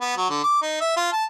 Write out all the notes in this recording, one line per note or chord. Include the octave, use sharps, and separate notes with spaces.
B3
F#3
D3
D6
D#4
E5
F4
A5